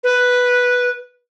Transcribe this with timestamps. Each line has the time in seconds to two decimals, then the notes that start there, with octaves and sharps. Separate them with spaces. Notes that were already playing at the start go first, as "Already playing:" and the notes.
0.04 B4